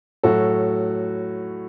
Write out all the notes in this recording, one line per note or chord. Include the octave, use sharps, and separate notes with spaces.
A2 F#3 F#4 A4